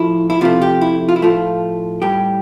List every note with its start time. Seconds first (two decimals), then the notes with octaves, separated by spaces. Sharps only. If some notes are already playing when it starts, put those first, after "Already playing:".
Already playing: A2 F3 A3 E4
0.30 E4
0.41 C3 F3 A3 F4
0.62 G4
0.81 E4
1.09 F4
1.16 E4
1.22 A2 F3 A3 F4
2.02 A2 G3 G4